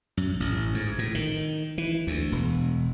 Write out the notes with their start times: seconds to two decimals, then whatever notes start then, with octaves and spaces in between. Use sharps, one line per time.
0.17 F#2
0.40 A1
0.75 G#2
0.98 A2
1.15 D#3
1.78 E3
2.07 D2
2.32 E1